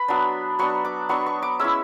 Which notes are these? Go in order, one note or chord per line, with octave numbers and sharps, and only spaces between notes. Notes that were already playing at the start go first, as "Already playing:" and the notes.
Already playing: B4 B5
F#3 B3 D4
F#3 B3 D4 C#6
D6
F#3 B3 D4 C#6
C#6
D6
G#3 C#4 E4 E6